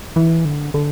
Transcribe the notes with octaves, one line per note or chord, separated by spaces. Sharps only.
E3
D3
D3